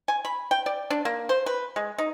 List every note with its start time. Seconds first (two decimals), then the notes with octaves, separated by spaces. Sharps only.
0.08 G#5
0.25 B5
0.51 G5
0.66 D5
0.90 D4
1.05 A#3
1.29 C5
1.46 B4
1.76 G#3
1.98 D#4